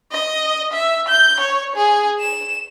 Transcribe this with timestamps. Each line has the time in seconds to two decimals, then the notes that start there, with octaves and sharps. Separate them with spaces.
0.12 D#5
0.73 E5
1.08 G6
1.40 C#5
1.76 G#4
2.20 E7